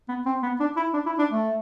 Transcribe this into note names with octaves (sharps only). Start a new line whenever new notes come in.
B3
C4
B3
D4
E4
D4
E4
D4
A3